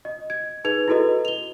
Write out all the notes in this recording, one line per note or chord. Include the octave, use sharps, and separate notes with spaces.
D#5
G#6
D#4 G#4 B4 G#6 F7
E4 F#4 A4 B4 D#5
F7 G7